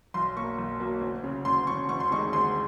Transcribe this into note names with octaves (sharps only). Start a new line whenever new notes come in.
B1 C6
B2 F#3 A#3 C#6
B1
B2 F#3 A#3
D2
C#3 F#3
D2 C6
C#3 F#3 C#6
D2 C#6
C6
C3 D#3 G#3 C#6
D2 C6